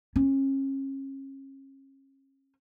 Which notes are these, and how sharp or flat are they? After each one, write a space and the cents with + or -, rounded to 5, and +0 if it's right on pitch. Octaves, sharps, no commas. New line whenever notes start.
C#4 -35